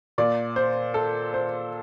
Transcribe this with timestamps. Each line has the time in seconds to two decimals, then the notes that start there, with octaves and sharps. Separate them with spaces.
0.18 A#2 D5
0.56 C5
0.94 A4
1.34 C5